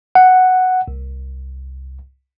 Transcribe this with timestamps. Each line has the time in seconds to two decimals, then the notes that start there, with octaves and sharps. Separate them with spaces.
0.15 F#5
0.88 C2